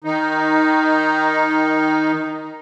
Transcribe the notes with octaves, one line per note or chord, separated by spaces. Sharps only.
D#3 D#4